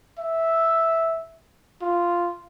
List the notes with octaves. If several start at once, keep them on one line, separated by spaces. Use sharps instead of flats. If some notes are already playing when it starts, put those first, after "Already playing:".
E5
F4